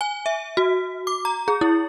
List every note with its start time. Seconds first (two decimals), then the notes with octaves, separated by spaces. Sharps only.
0.01 G#5
0.26 E5
0.57 F#4
1.07 D6
1.25 A#5
1.48 G#4
1.61 E4